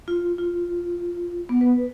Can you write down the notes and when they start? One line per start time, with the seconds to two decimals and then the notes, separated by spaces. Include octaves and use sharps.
0.08 F4
0.38 F4
1.49 B3
1.61 B4